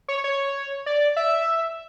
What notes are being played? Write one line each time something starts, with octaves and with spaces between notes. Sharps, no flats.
C#5
C#5
D5
E5